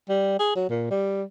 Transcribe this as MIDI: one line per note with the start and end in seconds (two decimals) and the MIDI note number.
0.09 0.34 55
0.39 0.53 68
0.56 0.65 54
0.70 0.90 46
0.91 1.23 55